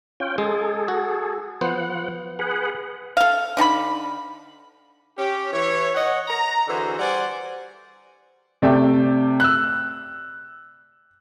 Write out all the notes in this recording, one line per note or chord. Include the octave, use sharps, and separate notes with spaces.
C#4 F4 G5
G#3 G#4 A4
F#4
F3 B3 C5 F#5
G#4 B4 F#5
A4 F5
D3 D#4 A5 B5
C#4 G4
E3 C#5
C#5 D#5 F#5
A#5
D3 E3 F#4 G#4 C5
G3 C5 D5 F#5 G#5
C3 A3 D5 E5 G5
E6 F#6